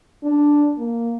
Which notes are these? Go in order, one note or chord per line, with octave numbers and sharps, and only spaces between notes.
D4
A#3